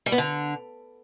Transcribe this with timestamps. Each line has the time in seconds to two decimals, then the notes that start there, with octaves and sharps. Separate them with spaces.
0.06 G3
0.12 B3
0.18 D3